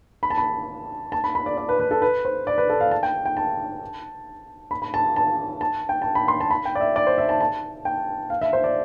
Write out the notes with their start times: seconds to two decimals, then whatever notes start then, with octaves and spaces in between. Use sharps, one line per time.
0.23 B5
0.30 A5
0.38 B5
1.12 A5
1.24 B5
1.35 B5
1.46 D5
1.57 D5
1.69 B4
1.80 B4
1.91 A4
2.02 B4
2.25 C5
2.47 D5
2.58 B4
2.69 A4
2.81 F5
2.91 A5
3.03 G5
3.26 G5
3.37 A5
4.71 B5
4.82 B5
4.94 A5
5.16 A5
5.61 A5
5.89 G5
6.02 A5
6.15 B5
6.28 C6
6.40 A5
6.51 B5
6.65 G5
6.75 D5
6.81 E5
6.96 D5
7.07 C5
7.18 E5
7.29 A5
7.41 A5
7.85 G5
8.30 F5
8.41 E5
8.53 C5
8.64 D5